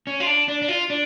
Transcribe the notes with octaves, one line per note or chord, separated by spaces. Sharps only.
C#4
F4
D4
D4
D4
F4
D4